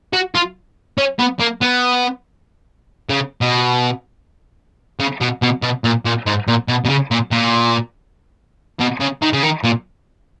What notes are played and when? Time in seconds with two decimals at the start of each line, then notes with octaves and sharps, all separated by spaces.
0.13 F#4
0.35 F4
0.98 C#4
1.19 B3
1.40 A#3
1.62 B3
3.10 C#3
3.41 B2
4.99 C#3
5.21 B2
5.42 B2
5.63 B2
5.84 A#2
6.05 A#2
6.26 G#2
6.48 A#2
6.68 B2
6.85 B2
6.89 C#3
7.11 A#2
7.31 A#2
8.80 B2
9.00 C#3
9.22 D#3
9.33 C#3
9.43 D#3
9.64 A#2